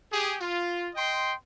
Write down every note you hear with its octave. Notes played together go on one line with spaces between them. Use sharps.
G4 G#4
F4
D#5 G5 C6